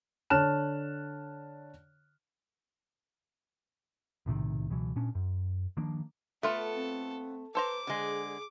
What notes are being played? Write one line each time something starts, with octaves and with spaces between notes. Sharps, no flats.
D3 C#5 A5 F6 F#6 E7
B1 A2 C3 D#3
C#2 B2 E3 F#3
A#2 C#4 D4
F#2
D#3 F3 A#3 D4
A3 B3 F4 A4 A5
C4
A4 B4 C5 A#5 D6
D3 G#3 G#4